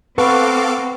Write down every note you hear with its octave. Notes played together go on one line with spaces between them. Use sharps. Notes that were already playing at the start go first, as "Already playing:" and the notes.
C4 A4 B4 F5 F#5 C#6 D6